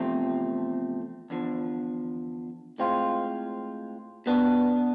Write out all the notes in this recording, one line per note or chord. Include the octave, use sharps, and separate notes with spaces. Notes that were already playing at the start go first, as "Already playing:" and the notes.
Already playing: E2 C3 F3 A3 C4
E2 D3 F3
A2 G#3 C4 F4
B2 B3 D4